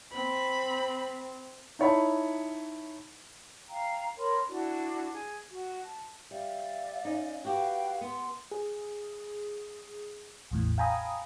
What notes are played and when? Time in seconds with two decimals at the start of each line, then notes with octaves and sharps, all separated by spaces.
0.13 C4 B5
1.79 D#4 E4 C#5 A5 B5
3.68 F5 G5 A#5
4.17 A#4 C#5 B5 C6
4.48 D4 E4 F#4 D5
5.12 G#4
5.50 F#4
5.82 A5
6.31 G3 D5 E5 F5
7.05 C#4 D#4
7.45 F#4 G4 B4 F5 G5
8.01 B3 C6
8.51 G#4
10.51 A1 E2 A2
10.78 F5 G5 G#5 A#5 B5 D#6